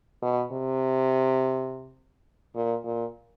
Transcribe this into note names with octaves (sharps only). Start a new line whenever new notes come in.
B2
C3
A#2
A#2